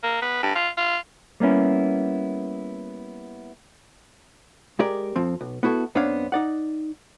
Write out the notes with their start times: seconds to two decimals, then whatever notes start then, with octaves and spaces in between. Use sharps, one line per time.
0.03 A#3
0.22 B3
0.43 G2
0.55 F4
0.77 F4
1.40 G3 A#3 B3 C#4 E4
4.79 G#3 G4 A#4 D5
5.16 F2 F3 C4
5.41 B1
5.63 B3 E4 F#4 A4
5.95 F#2 B3 C4 D4 C#5 F5
6.32 D#4 D5 F#5